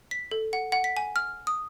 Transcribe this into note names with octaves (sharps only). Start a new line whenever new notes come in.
B6
A4
F#5
F#5
B6
G#5
F6
D#6